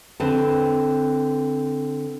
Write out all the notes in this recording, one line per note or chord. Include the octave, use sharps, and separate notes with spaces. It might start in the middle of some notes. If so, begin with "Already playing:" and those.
D3 C4 B4 A5